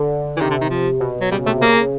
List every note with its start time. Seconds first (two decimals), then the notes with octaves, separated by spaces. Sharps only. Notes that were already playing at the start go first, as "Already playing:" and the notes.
Already playing: D3
0.36 E3
0.40 C3 D#3
0.50 D3
0.61 D#3
0.70 F3
1.00 B2
1.21 F#3
1.31 C#3 G3
1.46 C3 A3
1.61 C#3 A#3